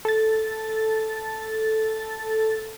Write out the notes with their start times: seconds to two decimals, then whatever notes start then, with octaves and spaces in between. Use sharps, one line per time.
0.05 A4 A6